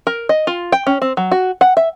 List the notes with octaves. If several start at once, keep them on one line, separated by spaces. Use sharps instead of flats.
A#4
D#5
F4
G5
C#4
C4
F#3
F#4
F#5
E5